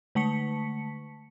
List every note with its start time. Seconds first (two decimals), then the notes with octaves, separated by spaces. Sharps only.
0.15 D3 A3 A5 C#6 B6 C#7